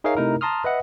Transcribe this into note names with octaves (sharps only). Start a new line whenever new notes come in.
D#4 G#4 A#4 C#5 E5 F5
C3 A3 D#4 E4 A#4
A5 A#5 C6 D#6 F6
B4 D#5 E5 F#5